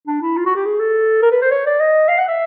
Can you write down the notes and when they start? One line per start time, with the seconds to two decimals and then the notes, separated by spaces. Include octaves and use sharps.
0.07 D4
0.22 E4
0.37 F4
0.46 F#4
0.55 G4
0.65 G#4
0.80 A4
1.22 A#4
1.32 B4
1.42 C5
1.51 C#5
1.66 D5
1.80 D#5
2.09 F5
2.18 F#5
2.28 E5